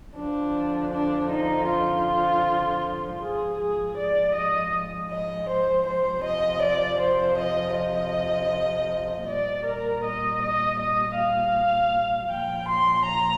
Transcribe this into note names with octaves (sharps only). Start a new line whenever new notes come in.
F2 D3 F3 D4
D4
D#4
F4
G#2 F3 G#4
G#4
D5
D#5
D#5
C5
C5
F2 C3 F3 D#5
D5
C5
D#5
D#5
A#2 G3 D5
A#4
D#5
D#5
D#5
F5
A#2 G5
F3
C6
A#5